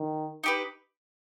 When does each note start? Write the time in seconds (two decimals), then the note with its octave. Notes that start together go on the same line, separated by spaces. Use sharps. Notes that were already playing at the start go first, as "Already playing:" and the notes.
Already playing: D#3
0.44 D#4 G4 B4